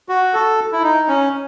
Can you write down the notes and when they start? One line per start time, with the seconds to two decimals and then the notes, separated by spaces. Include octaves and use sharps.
0.09 F#4
0.34 A4
0.72 E4
0.83 D#4
1.08 C#4